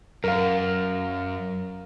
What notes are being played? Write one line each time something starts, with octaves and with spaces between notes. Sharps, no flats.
F#2 A#4 F5